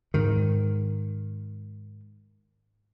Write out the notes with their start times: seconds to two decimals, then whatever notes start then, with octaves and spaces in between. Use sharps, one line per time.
0.14 G#2 D#3